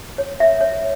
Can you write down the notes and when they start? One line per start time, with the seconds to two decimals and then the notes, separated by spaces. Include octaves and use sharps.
0.18 C#5
0.40 E5
0.61 C#5